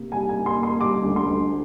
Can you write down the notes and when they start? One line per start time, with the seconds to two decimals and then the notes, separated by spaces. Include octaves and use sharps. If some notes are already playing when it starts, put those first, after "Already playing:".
Already playing: C3 A#3
0.12 G3 G#5
0.29 G#5
0.35 A#3
0.46 C6
0.58 A#3
0.63 C6
0.81 G3 D6
1.04 D2
1.16 C6
1.27 D2